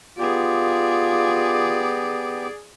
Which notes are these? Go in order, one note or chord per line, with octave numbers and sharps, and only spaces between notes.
B3 F4 G4 G#4 D5